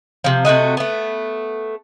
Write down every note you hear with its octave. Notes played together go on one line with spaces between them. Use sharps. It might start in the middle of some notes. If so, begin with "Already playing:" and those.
C3 F3
C3 A3 F#4 D#5
A3 B3